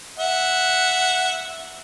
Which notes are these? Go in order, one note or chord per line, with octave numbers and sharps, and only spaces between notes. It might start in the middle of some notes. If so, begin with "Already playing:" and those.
E5 F#5